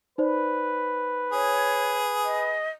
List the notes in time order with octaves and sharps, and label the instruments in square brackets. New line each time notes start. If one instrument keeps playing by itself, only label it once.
[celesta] D#4 C5 D5 [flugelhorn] B4
[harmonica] G#4 [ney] C#5
[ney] D#5